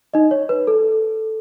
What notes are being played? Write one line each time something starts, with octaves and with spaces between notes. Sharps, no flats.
D#4 D#5
C#5
B4
A4